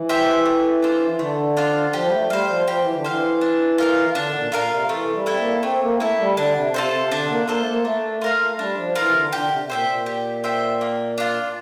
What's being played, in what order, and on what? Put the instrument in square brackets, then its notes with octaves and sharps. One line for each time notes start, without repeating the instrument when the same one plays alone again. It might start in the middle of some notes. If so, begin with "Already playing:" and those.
Already playing: [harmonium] E3
[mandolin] G4 C5 E5
A3
D4 F4 C5
[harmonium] E3
[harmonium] D3 [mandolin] A3
[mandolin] D4 F4 C5
[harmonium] F3 [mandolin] G4
[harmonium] G3
A3
[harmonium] G3 [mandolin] C5 F5
[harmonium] F3
[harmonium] F3 [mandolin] G4
[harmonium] E3
D3
[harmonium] E3 [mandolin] C5 F5
[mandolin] D4
F4 A#4 F5
[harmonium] D3 [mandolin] D4
[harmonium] A2
A#2
[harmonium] A#2 [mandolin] F4 A#4 F5
[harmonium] C3
[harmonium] E3 [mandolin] A3
[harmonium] G3
[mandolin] E4 A4
[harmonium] C4
A#3
[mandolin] A3 [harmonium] C4
[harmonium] A#3
[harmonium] A3 [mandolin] E4 A4
[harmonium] G3
[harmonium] D3 [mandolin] D4
[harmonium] C3
[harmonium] C3 [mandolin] F4 A4 C5
[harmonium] C3
[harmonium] D3 [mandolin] D4
[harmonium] A#3
[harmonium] A#3 [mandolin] F4 A4 C5
[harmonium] A3
A#3
[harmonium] A3 [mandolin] D4
[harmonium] A3 [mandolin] F4 A#4 F5
[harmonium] G3 [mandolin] D4
[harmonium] F3
[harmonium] E3 [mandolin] F4 A#4 F5
[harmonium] C3
D3
[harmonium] D3 [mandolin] G4
[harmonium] C3
C3
[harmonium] A#2 [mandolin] C5 E5 G5
[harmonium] A#2
[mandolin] G4
C5 E5 G5
A#3
D4 F4